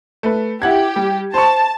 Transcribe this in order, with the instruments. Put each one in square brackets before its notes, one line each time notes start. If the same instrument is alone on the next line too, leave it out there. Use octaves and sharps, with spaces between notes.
[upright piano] A3 B4
[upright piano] E4 F#5 G#6 [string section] G4
[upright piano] G3
[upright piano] C5 C#6 [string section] A5